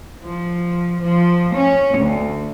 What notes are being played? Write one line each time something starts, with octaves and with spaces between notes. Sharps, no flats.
F3
F3
C#4
D2